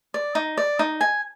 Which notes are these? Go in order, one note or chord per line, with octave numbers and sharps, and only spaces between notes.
D5
D#4
D5
D#4
G#5